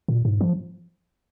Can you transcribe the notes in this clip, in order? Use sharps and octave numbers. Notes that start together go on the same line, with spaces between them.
A#2
G#2
F3